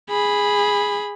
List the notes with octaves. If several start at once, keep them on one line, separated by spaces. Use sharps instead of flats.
G#4 B5